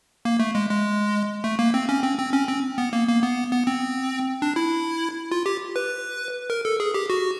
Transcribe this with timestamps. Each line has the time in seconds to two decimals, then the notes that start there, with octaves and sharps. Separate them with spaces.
0.25 A#3
0.40 A3
0.55 G#3
0.70 G#3
1.44 A3
1.59 A#3
1.74 C4
1.89 C#4
2.03 C4
2.19 C4
2.33 C#4
2.48 C4
2.78 B3
2.93 A#3
3.08 A#3
3.23 B3
3.52 B3
3.67 C4
4.42 D4
4.56 E4
5.32 F4
5.46 G4
5.76 B4
6.50 A#4
6.65 A4
6.80 G#4
6.94 G4
7.10 F#4